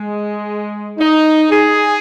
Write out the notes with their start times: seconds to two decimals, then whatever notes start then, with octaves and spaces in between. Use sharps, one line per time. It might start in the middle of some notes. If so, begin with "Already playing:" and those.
Already playing: G#3
0.98 D#4
1.50 G#4